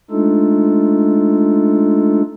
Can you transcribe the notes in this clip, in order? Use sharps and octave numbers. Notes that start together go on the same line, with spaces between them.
G#3 A3 D4 D#4 F4 A4